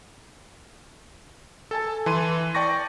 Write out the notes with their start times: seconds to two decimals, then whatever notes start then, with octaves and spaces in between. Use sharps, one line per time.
1.71 A4 G#5 A5
2.06 E3 C6 D#7
2.55 D5 G5 A5 C#6 A#6